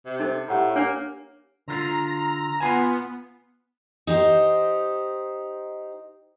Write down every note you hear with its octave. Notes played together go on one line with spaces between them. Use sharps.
C3
D#4 A4 C5
A2 G4 F#5 A#5
A#3 D4 A#4 C#5
D3 F4 A#5
B3 F4 G#5
D#4 G4 C5